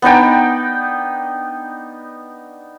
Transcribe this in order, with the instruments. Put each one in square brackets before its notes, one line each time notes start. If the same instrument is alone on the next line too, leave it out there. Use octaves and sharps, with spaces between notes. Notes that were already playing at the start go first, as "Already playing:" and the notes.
[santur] B3 D4 D#4 G5